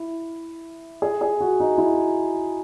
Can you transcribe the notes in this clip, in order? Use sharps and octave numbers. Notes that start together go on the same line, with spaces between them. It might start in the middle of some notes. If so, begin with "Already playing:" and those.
Already playing: E4
G#4
G#4
F#4
D#4
E4